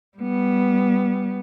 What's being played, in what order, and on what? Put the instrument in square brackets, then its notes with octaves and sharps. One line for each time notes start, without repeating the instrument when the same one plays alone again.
[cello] G3 B3